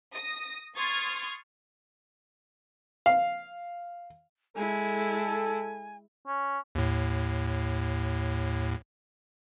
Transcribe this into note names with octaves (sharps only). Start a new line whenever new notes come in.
D#6 A#6
C6 C#6 D#6 F6 G#6 A6
F5
G#3 E4 A4 G#5
C#4
D#2 A2